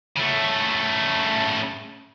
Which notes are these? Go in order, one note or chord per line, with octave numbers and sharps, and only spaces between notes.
C#3 A3